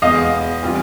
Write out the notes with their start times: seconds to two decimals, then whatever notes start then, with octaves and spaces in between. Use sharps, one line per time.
0.02 E2 B2 G#3 B3 D#5 F5
0.63 E3 G3 C4 F4